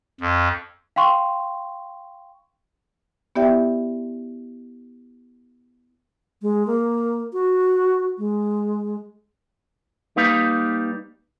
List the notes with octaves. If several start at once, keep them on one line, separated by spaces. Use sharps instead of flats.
F2
F5 G5 C6 C#6
B3 E4 G4 D5 E5 G5
G#3
A#3
F#4
G#3
G3 A#3 D#4 B4 F5